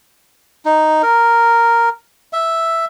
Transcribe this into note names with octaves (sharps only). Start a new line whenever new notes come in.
D#4
A#4
E5